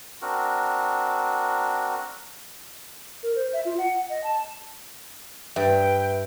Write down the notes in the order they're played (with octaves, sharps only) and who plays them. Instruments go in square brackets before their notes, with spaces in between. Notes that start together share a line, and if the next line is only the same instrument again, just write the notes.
[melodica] C4 D4 F#4 A#4
[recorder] A#4
C5
E5
F4
F#5
D#5
A5
[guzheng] G2 [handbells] B4 E5 [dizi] G5